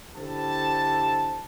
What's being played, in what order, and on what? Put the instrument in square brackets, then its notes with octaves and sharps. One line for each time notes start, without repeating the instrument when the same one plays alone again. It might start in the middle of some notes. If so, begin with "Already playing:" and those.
[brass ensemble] D3 E4 G4 A4 C5 A5